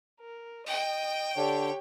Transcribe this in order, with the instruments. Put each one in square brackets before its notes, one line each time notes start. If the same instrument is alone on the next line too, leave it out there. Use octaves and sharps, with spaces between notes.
[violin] A#4
[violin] D#5 [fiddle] G5
[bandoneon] D3 D4 [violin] G4 C#5